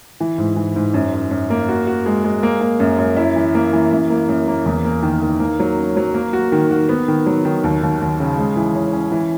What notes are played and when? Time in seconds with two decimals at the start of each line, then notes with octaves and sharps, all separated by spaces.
0.20 E3
0.38 G#2
0.56 E3
0.76 G#2
0.94 F#2
1.13 F#2
1.31 F#2
1.50 A#3
1.68 F#4
1.87 F#4
2.06 G#3
2.24 G#3
2.43 A#3
2.61 A#3
2.80 F#2
2.98 F#2
3.17 E4
3.36 E3
3.55 A#3
3.73 E3
3.92 F#2
4.10 A#3
4.29 F#2
4.48 A#3
4.65 E2
4.85 A#3
5.03 D#3
5.22 D#3
5.40 A#3
5.59 F#3
5.77 C#4
5.96 F#3
6.14 A#3
6.33 F#4
6.52 D#3
6.70 F#4
6.89 B3
7.08 D#3
7.26 F#3
7.45 D#3
7.64 D#2
7.82 D#2
8.01 D#2
8.20 C#3
8.38 G#3
8.56 E3
8.75 C#4
8.93 C#4
9.12 E3